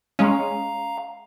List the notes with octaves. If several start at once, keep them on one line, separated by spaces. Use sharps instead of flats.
G#3 C#4 F5 A#5